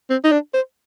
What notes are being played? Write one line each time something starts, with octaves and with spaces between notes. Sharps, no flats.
C4
D#4
D4
C5